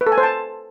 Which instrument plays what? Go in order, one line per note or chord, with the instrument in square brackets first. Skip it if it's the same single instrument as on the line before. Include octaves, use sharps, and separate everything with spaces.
[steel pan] B4
A4
G#5
C5
A5